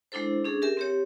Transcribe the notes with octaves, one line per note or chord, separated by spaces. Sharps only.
G#3 D4 E4 A4 C5
C#4 D4 G#4 A4
G4 A#4 E5 G#5
C4 G4 C#5